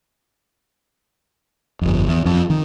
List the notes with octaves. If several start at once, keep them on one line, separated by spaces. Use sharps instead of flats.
G1 F2
E2
F2
D#3